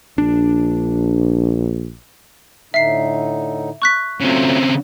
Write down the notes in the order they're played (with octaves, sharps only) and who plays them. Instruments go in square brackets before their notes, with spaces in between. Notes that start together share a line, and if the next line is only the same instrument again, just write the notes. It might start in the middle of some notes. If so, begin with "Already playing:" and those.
[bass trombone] A#1 [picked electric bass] D4
[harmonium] A2 D3 D#4 [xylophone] E5 C7
[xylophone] C#6 F#6 B6
[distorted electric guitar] C#3 C4 [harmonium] F#3 A3 F4